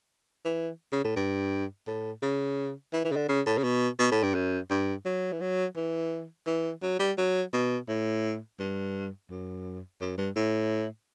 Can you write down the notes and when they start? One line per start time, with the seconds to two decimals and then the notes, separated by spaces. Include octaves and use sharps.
0.45 E3
0.92 C#3
1.04 A2
1.16 G2
1.87 A2
2.22 C#3
2.93 E3
3.05 E3
3.12 C#3
3.16 D3
3.28 C#3
3.46 A2
3.58 C#3
3.63 B2
3.99 B2
4.11 A2
4.23 G2
4.34 F#2
4.70 G2
5.05 F#3
5.32 E3
5.41 F#3
5.76 E3
6.46 E3
6.82 F#3
6.99 G3
7.18 F#3
7.53 B2
7.89 A2
8.59 G2
9.30 F#2
10.01 F#2
10.18 G2
10.36 A2